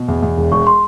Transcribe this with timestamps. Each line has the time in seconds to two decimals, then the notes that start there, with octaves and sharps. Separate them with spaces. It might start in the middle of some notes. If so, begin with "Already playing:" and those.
Already playing: B2
0.08 E2
0.22 E2
0.37 E1
0.51 E1 C#6
0.67 C6